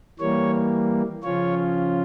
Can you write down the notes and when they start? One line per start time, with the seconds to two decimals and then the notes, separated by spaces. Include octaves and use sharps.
0.19 E3 G3 A#3 C#5
1.23 C#3 F3 C#4 F4 C#5